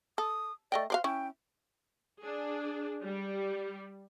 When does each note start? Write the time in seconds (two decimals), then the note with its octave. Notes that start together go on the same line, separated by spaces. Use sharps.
0.18 A4 D#6
0.72 A3 D5 D#5 G5
0.90 F#4 C5 D5 F5
1.04 C#4 E4 G5
2.21 D4 G#4
3.05 G3